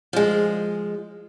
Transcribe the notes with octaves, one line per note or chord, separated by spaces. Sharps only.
F3 G#3